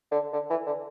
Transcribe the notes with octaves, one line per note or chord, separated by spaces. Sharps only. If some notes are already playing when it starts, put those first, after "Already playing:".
D3
D3
E3
D3